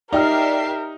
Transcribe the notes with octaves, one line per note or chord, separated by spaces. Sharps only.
D#4 G4 A#4 D5 E5 G5 F6 C7